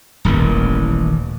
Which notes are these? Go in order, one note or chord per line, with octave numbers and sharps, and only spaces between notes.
D#1 A1 D#3 E3